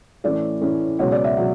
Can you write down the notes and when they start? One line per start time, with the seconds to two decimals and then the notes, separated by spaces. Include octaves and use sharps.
0.24 A2 E3 A3 C#4 D5
0.61 A2 E3 A3 C#4
0.99 C#2 B2 F#3 C#5
1.12 D5
1.24 E5
1.37 B2 F#3